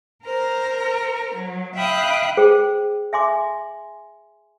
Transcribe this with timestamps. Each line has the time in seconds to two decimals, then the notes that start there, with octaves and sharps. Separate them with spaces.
0.24 A#4 C5 A#5
1.34 F#3
1.76 E5 F5 G5 B5 D#6 F#6
2.37 G#4 C5 G5
3.13 E5 G#5 C6 D6